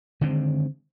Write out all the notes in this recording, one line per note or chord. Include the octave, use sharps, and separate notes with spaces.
D3 D#3 G#3 C4